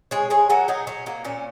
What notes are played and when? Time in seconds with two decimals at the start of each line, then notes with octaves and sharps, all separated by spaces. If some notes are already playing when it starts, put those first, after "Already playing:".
0.11 G#3 G#4 C#5
0.30 G#3 G#4 C#5
0.50 F#3 F#4 A#4
0.68 F#3 D#4 G#4
0.87 F#3 C#4
1.06 F#3 A#3
1.24 A#2 C#4